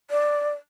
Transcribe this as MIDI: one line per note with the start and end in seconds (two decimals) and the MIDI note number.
0.10 0.51 74